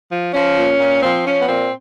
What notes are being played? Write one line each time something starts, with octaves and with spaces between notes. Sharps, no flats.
F3
F3 C#4
A#2
A#2
F3 C4
F3 C#4
B3
A#2 C4